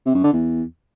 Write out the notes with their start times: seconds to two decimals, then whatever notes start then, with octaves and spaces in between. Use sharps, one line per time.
0.06 C3
0.15 F#2
0.24 D3
0.33 E2